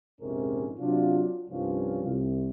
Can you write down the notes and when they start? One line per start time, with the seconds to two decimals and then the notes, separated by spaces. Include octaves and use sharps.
0.21 A#1 F2 G#2 C3 C#4 A#4
0.79 C3 F#3 D4 F4
1.50 C2 G2 F3 C#4 F4
2.03 C2